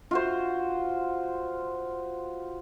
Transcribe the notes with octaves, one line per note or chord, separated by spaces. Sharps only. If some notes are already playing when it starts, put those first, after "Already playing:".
F4 F#4 C5